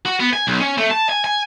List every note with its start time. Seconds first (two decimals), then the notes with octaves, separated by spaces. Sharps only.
0.06 F#4
0.20 B3
0.33 G#5
0.47 B1
0.60 C#4
0.78 A3
0.90 A5
1.09 G#5
1.24 G#5